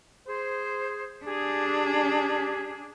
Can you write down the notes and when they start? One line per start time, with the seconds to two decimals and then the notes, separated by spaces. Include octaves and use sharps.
0.26 G#4 C5
1.25 D4 G4 G#4